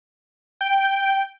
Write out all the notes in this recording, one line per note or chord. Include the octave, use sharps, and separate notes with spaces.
G5